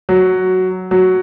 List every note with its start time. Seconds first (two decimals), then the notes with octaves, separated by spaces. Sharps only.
0.09 F#3
0.91 F#3